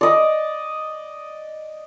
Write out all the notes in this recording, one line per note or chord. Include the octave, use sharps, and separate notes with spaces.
D5 D#5